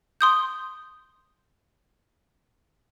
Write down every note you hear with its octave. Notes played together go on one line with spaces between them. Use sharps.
C6 D#6 G6